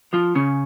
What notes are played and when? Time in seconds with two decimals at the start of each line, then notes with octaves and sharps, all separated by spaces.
0.13 F3 F4
0.35 C#3 C#4